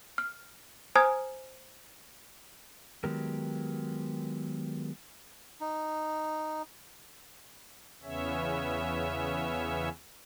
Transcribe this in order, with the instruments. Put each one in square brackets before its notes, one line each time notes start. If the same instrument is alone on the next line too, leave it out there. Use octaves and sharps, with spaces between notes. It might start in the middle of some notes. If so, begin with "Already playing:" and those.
[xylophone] F6
C5 G#5 A#5 D#6 F6 G#6
[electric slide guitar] D#3 F#3 G#3 B3 G4 A#4
[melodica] D#4
[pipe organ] E2 C#3 B3 C#4 C#5 E5